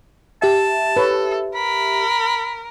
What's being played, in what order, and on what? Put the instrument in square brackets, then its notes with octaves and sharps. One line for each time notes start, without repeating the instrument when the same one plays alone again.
[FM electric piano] G4 E5 [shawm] A5
[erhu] A4 [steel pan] B4 C#5
[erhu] A#4 [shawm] B5